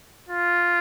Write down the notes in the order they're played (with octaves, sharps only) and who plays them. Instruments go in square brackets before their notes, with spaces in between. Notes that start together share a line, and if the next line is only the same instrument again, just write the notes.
[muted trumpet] F4